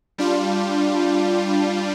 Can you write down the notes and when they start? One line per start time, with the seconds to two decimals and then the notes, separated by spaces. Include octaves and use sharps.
0.18 G3 D4 F4